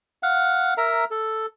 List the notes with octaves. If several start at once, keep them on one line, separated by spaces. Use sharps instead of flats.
F5 F#5
A#4 E5 A#5
A4